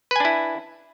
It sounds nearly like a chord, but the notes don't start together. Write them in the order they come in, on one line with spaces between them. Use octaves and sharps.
B4 G#5 D4 E4